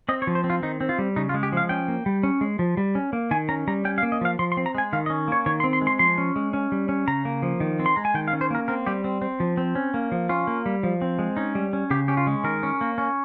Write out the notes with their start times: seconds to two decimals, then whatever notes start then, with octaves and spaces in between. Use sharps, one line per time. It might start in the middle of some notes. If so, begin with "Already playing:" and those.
0.09 C4 D#5
0.22 C#5
0.27 F3
0.35 C5
0.44 C4
0.50 F4
0.63 D#3 D#4
0.81 C4
0.89 F4
0.99 G3
1.16 C#3 D#4
1.29 F4
1.34 G#3
1.43 G4
1.53 F3 F5
1.69 C#4 G5
1.88 A#3
2.06 G3
2.23 C#4
2.41 G#3
2.59 F3
2.77 G3
2.95 C#4
3.13 A#3
3.31 D#3 G#5
3.49 C#4 A#5
3.68 G3 A#5
3.85 C#4 G5
3.98 F5
4.03 A#3
4.12 D#5
4.21 F3 F5
4.39 F3 C6
4.52 C6
4.57 C4
4.66 A#5
4.75 G#3 G#5
4.93 D#3 F5
5.06 D#5
5.10 C#4
5.28 A#3 C#5
5.46 D#3 C#5
5.60 C6
5.64 C4
5.73 C6
5.81 G#3
5.87 C6
5.99 F3 C6
6.18 C#4
6.36 G#3
6.53 C#4
6.72 G3
6.89 C#4
7.08 C#3 A#5
7.25 A#3
7.43 F3
7.60 D#3
7.79 C4
7.86 C6
7.96 G#3 A#5
8.05 G#5
8.14 D#3 G5
8.28 F5
8.33 C#4
8.41 C5
8.51 A#3 A#4
8.68 C4 A#4
8.87 G3 G4
9.04 C4
9.22 C4
9.40 F3
9.57 C4
9.75 C#4
9.94 A#3
10.12 F3
10.29 C#4 F4
10.47 A#3
10.66 G3
10.83 F3
11.02 C4
11.19 G#3
11.37 C#4 D#4
11.55 G3
11.73 C#4
11.91 C#3 G4
12.08 C#4 G4
12.17 F4
12.27 G#3
12.44 D#3 A#4
12.63 C#4
12.81 A#3
12.98 C#4